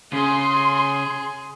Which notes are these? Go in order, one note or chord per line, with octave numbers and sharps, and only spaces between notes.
C#3 G#4 C6